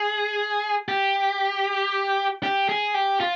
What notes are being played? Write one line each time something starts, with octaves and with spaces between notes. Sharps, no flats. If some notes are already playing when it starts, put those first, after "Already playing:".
Already playing: G#4
G4
G4
G#4
G4
F4